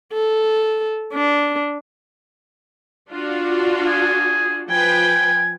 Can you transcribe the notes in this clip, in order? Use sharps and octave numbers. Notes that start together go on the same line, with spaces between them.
A4
D4
D4 F4 F#4
G#4
F3 B4 G5 G#5